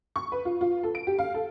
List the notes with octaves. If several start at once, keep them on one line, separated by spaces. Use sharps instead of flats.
C#6
B4
F4
F4
A4
D7
G4
F5
A4